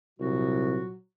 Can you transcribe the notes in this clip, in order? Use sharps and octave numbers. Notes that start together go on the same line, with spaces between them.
C2 A#2 F#3 F#4